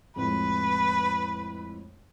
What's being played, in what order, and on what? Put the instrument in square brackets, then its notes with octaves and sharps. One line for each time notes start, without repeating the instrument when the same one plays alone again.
[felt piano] F2 A2 G#3 [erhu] B4